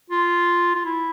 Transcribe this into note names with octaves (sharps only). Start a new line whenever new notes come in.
F4
F4
E4